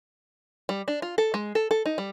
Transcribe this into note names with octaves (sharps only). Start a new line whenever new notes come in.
G3
D4
F4
A4
G#3
A4
A4
D#4
G3